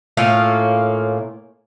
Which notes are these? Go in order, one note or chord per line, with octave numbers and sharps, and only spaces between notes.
A2 A#3 C#4 F4